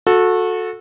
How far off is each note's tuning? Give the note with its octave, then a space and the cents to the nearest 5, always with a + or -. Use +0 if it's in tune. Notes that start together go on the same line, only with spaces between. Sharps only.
F#4 -25 A4 +0